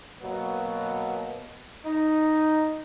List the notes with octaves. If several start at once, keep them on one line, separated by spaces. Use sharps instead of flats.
B2 F#3 A#3 B3
D#4